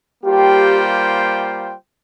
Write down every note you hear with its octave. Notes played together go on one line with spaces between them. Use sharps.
G3 A#3 F4 G4 C5 G5